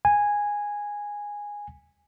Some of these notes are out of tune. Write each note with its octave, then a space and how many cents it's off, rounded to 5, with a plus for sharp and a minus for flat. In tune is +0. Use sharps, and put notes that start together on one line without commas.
G#5 -10